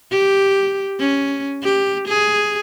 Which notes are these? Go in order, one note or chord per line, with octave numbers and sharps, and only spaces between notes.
G4
C#4
G4
G#4